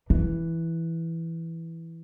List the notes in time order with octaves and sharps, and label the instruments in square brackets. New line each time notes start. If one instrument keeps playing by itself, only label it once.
[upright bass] E3